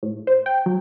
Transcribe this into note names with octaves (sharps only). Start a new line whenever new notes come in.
A2
C5
G5
F#3